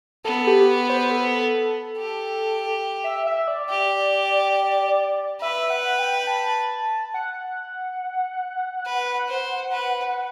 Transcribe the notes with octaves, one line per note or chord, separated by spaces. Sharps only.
B3 A4
G4
C5
A4
G4
E5
E5
D5
G4
B4 E5
F#5
G5
A5
F#5
B4
C5
B4